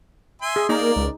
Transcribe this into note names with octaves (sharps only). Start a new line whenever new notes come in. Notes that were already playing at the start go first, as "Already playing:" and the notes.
E5 G#5 C6
G#4
A#3 D#4 A#4 D5
C#2